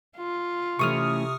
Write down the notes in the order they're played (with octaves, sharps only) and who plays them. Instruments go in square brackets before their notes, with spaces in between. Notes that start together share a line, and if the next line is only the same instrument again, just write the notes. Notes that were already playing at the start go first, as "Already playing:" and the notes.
[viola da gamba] F4
[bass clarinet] C3 [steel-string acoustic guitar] E3 A3 C#4 [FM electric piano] C#6 D#6 F6